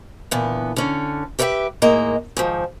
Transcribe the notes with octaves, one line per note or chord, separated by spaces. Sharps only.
A#2 D3 E3 B3
D3 C#4
G4 A#4 B4 D5 E5 G5
A2 D#3 G#3 A#3 D#5 A#5
G#2 D#3 F3